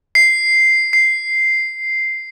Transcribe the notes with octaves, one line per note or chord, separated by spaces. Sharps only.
C7
C7